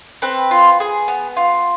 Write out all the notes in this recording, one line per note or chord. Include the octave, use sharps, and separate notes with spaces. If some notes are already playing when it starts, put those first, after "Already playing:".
C4 B4
F4
G#4
B3
F4